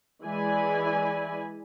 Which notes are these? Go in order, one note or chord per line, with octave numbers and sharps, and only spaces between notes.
E3 G#3 E4 D5 G#5 B5